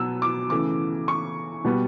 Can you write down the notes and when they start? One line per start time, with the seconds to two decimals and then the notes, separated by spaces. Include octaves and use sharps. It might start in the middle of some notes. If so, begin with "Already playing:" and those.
Already playing: B2 F#3 B3 E6
0.22 D6
0.50 C#3 E3 A3 D6
1.08 C#6
1.64 B2 G3 B3